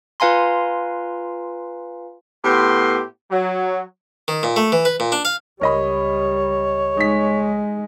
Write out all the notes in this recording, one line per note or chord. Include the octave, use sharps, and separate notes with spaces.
F4 B4 F5 G#5 A#5 C6
A2 B3 G4 C6
F#3
D#3
A#2
A3
E3
B4
A#2
D4
F5
C#2 G3 A#4 C#5 D#5 B5
G#3 D#4 B6